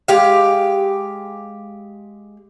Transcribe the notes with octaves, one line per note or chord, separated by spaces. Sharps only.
G#3 G4 F5